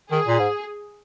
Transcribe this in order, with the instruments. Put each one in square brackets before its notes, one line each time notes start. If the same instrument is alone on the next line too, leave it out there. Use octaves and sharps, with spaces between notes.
[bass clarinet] D#3 [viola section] G#4
[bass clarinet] A#2
G#2